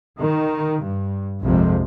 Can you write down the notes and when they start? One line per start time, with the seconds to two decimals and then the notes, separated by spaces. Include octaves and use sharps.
0.18 D#3
0.83 G2
1.43 A#1 F2 C3 F3 G#3